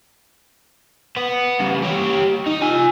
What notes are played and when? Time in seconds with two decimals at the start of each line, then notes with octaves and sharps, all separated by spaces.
1.16 B3
1.59 C#3 G3
1.82 G4 C#5
2.46 D#4
2.62 F4 G#5